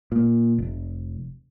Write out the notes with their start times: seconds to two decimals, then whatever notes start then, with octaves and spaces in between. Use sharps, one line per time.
0.12 A#2
0.58 F1